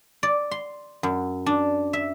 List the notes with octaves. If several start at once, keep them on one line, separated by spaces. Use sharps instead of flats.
D5
C6
F#2
D4
E5